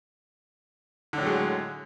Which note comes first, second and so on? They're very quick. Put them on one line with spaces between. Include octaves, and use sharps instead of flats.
D3 A2 F#3 G#3